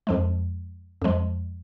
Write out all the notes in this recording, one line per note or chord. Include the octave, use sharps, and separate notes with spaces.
F2 F3 G#3
F2 F3 G#3